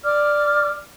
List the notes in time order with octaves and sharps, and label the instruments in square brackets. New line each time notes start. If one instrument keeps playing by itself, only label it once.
[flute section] D5 D6 F6